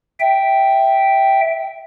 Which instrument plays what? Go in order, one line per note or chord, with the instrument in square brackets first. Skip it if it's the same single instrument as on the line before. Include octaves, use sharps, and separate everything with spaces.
[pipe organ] E5 G5